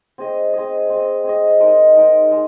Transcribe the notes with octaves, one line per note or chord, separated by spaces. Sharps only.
C4 G#4 D#5
C4 G#4 D#5
C4 G#4 D#5
C4 G#4 D#5
G#3 D#4 A#4 D#5
G#3 D#4 A#4 D#5
G#3